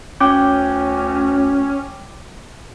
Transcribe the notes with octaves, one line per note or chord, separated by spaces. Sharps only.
D2 C#4 G5 D6 F#6 G6